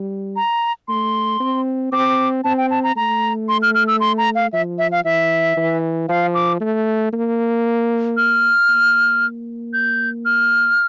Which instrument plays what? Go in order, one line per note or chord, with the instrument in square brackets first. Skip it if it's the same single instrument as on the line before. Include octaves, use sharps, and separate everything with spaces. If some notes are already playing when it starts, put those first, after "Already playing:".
Already playing: [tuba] G3
[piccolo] A#5
[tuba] A3 [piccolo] C6
[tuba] C4
[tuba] C4 [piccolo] D6
[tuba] C4 [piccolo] A5
[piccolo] G5
A5
A#5
[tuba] A3 [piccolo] A#5
[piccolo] C6
F6
F6
E6
C6
A#5
F5
[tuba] F3 [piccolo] E5
[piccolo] E5
F5
[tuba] E3 [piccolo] E5
[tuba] E3
[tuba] F3 [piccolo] F5
[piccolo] D6
[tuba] A3
A#3
[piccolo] F6
[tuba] A#3
[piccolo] G6
F6